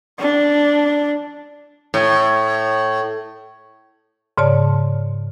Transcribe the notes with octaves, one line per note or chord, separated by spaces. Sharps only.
D4
A2
G#2 C#3 C#5 D5 A5